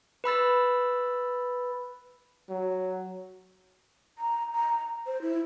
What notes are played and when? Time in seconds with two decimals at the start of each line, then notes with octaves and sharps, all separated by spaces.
0.24 B4 B5 E6 A6
2.50 F#3
4.18 A#5
4.53 A#5
5.07 C5
5.22 E4